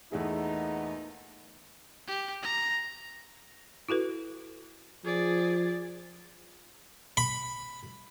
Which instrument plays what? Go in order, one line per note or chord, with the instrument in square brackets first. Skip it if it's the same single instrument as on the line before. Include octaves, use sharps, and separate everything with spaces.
[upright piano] E2 A3 G#4 [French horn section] A#2 B3 D#4
[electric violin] G4
A#5
[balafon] E4 F#4 A4 B4
[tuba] F3 [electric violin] G#4 D5
[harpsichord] B5